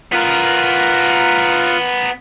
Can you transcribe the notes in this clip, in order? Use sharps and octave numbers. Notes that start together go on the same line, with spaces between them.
B3 F4 A#4 F#5